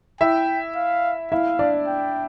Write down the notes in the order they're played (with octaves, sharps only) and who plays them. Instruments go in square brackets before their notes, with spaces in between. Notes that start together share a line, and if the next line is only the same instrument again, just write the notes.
[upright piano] E4 E5 [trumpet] G5
[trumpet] F5
[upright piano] E4 E5 [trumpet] F5
[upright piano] D4 D5
[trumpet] G5